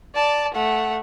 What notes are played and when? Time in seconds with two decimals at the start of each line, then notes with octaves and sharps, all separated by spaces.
0.15 D5 A5
0.54 A3 F#5